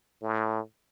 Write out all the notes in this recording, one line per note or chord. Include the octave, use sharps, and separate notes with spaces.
A2